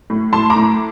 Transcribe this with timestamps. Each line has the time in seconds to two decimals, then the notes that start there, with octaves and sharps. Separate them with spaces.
0.10 A2
0.33 A2 A5 C6
0.50 A#5 D6
0.56 A2